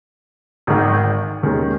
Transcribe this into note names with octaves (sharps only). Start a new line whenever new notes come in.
G#1 G#2 D#3
D#2 D#3 G#3 C#4